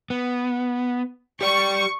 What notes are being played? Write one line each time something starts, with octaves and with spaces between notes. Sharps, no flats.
B3
G4 D5 C#6